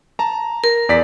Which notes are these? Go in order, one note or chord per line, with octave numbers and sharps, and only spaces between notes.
A5 A#5
A#4
E2 D5 B6